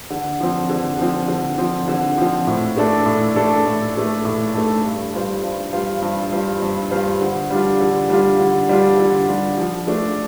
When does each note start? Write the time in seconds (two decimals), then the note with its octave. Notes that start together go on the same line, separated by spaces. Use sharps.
0.10 D3
0.40 F3 C4
0.69 D3
0.99 F3 C4
1.28 D3
1.58 F3 C4
1.88 D3
2.18 F3 C4
2.47 A2
2.76 A3 D4 A4
3.06 A2
3.35 A3 D4 A4
3.65 A2
3.95 A3 D4 A4
4.25 A2
4.54 A3 D4 A4
4.83 G2
5.14 G3 F4 C5 F5
5.43 G2
5.73 G3 F4 C5 F5
6.02 G2
6.32 G3 F4 C5 F5
6.62 G2
6.90 G3 F4 C5 F5
7.21 D3
7.50 G3 D4 F4
7.80 D3
8.10 G3 D4 F4
8.39 D3
8.69 G3 D4 F4
8.98 D3
9.28 G3 D4 F4
9.58 F3
9.87 A3 D4